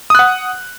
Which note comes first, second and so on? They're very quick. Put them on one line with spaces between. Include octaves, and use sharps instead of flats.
D#6 F#6 F#5